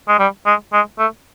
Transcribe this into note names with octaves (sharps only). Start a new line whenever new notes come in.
G#3
G3
G#3
G#3
A3